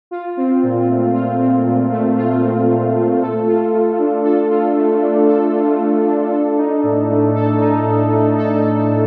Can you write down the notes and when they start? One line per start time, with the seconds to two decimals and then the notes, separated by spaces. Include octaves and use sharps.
0.11 F4
0.37 C4
0.63 A#2
0.89 A3
1.14 F4
1.41 C4
1.66 A#2
1.92 A3
2.18 F4
2.44 C4
2.70 A#2
2.96 A3
3.22 A4
3.47 F4
3.73 A3
3.99 D4
4.24 A4
4.51 F4
4.77 A3
5.03 D4
5.28 A4
5.54 F4
5.80 A3
6.06 D4
6.31 A4
6.57 D#4
6.83 A2
7.09 A3
7.36 A4
7.61 D#4
7.87 A2
8.12 A3
8.38 A4
8.64 D#4
8.90 A2